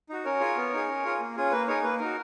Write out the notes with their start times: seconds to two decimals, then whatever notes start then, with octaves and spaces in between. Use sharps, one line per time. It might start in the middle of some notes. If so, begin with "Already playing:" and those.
0.09 D#4 F#4
0.25 C#4 A#4 C#5
0.41 F4 G#4
0.56 B3
0.73 D#4 G#4
0.88 C#4
1.05 F4 G#4
1.20 A#3
1.37 C#4 F4 G#4
1.52 A#3 B4
1.68 D#4 G#4 A#4 C#5
1.84 A#3 B4
1.99 D#4 F#4 A#4